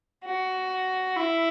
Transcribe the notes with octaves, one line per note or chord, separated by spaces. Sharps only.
F#4
E4